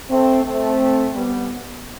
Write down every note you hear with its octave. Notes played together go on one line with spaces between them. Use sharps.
A3 C4
A3 C4
G3 B3